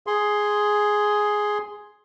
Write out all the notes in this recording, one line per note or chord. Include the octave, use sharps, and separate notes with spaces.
G#4 C6